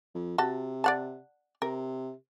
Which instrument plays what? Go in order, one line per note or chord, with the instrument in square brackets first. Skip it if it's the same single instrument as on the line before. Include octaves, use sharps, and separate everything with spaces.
[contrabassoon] F2
[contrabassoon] C3 [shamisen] F#4 A5
[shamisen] D5 F#5 A5
[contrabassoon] C3 [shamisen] A#4